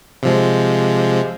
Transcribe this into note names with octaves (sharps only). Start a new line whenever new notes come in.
C3 F3 G#3